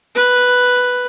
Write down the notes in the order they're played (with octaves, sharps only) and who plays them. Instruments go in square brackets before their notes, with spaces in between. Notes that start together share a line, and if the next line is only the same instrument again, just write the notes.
[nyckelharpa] B4